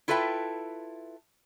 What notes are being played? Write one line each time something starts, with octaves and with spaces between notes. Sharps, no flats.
E4 F4 A4 B4 E5 G5